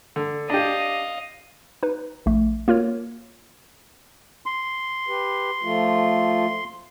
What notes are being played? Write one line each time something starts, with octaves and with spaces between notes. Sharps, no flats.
D3
D4 G4 D#5 F5
D#4 B4
A#1 A3
A#3 F4 A#4 C#5
C6
G4 B4
F3 A3 F4